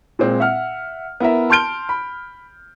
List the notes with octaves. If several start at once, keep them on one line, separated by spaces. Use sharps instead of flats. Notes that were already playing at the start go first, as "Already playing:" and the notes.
A#2 G#3 C4
E5 F#5 F6
B3 E4 A#4 E5
A5 C6 F6 G6 D7 G7
B5